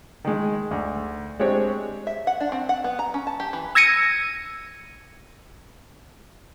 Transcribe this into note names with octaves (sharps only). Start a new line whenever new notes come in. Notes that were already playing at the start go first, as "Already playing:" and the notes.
D#3 G#3
D2
G#3 C4 D4 G4 C#5
E5
F#5
D4
C4
F#5
B3
A#5
C#4
A5
G4
E3
E6 G#6 A#6 C#7 D#7